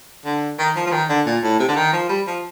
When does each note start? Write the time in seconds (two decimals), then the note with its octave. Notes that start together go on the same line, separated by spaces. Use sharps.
0.26 D3
0.59 D#3
0.76 F3
0.87 F3
0.92 D#3
1.09 D3
1.26 A#2
1.43 A2
1.60 C3
1.68 D3
1.76 D#3
1.93 F3
2.09 G3
2.27 F3